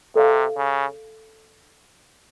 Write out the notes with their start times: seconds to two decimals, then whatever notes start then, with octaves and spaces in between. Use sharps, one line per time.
0.15 C3 A4 D5 F5
0.57 C#3